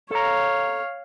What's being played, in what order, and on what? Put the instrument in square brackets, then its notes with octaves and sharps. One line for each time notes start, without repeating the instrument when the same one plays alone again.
[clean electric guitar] A4 A#5 [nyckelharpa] C#5 F5